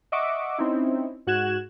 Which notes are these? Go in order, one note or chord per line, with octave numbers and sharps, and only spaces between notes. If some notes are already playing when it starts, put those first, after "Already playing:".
D#5 E5 F#5 C#6 D6
C4 C#4 D#4 E4
G#2 F#4 F#6 G#6 E7